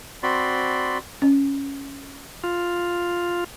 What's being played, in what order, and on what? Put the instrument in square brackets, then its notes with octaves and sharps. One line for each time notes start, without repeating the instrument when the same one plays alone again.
[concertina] C4 F#4 D5 B5 C6
[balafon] C#4
[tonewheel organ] F4